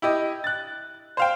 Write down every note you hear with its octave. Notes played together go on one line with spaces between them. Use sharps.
E4 G4 D#5
F#6 A6
C5 F5 G5